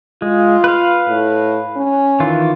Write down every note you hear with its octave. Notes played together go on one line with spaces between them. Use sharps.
G#3 F4
B4 F5
A2
C#4
D#3 E3 F4